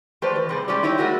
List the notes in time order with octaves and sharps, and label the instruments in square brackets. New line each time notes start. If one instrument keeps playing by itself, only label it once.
[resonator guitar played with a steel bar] F3 A3 G4 B4 C5 D5
E3
C3 G3 G#4
G3 G#3 C#4 G4 D5
D#4 E4 G4 C#5
G3 G#3 A#3 E4 F#4